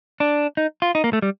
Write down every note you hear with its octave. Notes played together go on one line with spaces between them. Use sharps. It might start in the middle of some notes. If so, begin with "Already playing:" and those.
D4
D#4
F4
D#4
A#3
A3
G3